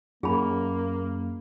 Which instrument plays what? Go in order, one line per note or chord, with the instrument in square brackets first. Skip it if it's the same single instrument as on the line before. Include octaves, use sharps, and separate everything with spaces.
[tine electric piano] F#2 [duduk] A#3 [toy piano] G#4 B5